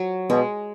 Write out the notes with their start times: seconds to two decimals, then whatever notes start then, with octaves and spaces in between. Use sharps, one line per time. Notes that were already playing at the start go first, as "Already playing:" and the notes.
Already playing: F#3
0.30 B2 G#3